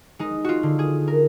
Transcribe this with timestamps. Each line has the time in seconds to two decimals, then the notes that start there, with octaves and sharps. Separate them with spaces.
0.19 G#3 D#4
0.45 F4 F#4
0.63 D3
0.79 G#4
1.08 A#4